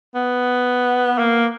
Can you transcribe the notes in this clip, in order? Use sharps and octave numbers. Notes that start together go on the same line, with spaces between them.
B3
A#3